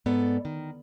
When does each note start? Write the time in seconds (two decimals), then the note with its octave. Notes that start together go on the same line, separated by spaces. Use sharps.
0.06 G#2 B3 A4 D5
0.45 D#3